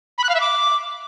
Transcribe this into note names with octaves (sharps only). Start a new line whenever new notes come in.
B5
F#6
F5
E5
D6